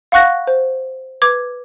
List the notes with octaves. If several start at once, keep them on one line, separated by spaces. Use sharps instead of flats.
F5 F#5 C#6 F#6 A#6
C5
B4 D6 G#6